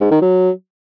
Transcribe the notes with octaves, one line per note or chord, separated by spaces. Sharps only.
G#2
D#3
F#3